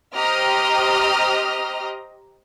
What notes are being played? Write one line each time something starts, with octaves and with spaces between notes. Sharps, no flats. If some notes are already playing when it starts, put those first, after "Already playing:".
G4 C5 D#5 A#5 D#6 F6